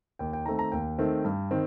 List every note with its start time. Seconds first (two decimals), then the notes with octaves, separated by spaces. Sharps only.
0.19 D#2 G5
0.33 G5
0.46 D#3 A3 C4 A#5
0.59 A#5
0.72 D#2 G5
0.99 D#3 A3 C4
1.24 G2
1.51 D#3 C4